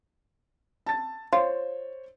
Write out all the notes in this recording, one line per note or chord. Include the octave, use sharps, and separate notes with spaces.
A5 A6
F4 C5 C#5